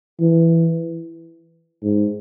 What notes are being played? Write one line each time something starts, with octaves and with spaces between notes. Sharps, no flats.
E3
G#2